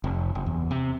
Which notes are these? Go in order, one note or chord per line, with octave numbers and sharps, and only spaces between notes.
F1
F#1
E2
C3